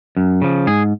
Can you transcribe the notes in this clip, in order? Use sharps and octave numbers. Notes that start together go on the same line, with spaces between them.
F#2
C#3 F3
G#2 G#4